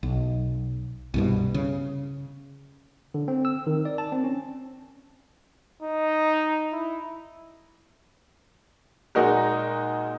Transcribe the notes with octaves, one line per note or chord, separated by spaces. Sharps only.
B1
C2 G2 B2
C#3
D3
C4
E6
D#3
D5
A5
C4
C#4
D#4
E4
A#2 G#3 D#4 F#4 A#4